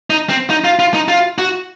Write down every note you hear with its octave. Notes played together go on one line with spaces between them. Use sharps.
D#4
C4
D#4
F4
F4
D#4
F4
F#4